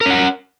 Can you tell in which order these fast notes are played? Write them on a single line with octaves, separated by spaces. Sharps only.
A#4 C#4 F#5